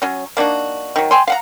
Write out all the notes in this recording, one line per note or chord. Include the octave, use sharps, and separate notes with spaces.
F#3 C#4
A#3 D4 D#4 F#4
D#3 F#3
G5 G#5 C6
F5 F#5 A#5